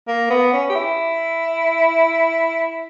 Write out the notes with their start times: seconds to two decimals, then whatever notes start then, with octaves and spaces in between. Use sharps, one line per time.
0.08 A#3
0.30 B3
0.53 C#4
0.70 G4
0.75 E4